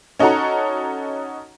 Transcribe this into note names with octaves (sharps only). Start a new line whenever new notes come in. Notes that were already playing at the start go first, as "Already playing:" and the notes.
C#4 D#4 F#4 A4 F#5 A#5